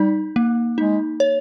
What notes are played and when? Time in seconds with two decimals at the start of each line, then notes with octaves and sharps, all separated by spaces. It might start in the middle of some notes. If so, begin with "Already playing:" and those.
Already playing: G3 D#4
0.36 A#3
0.78 G#3 D#4
1.20 C#5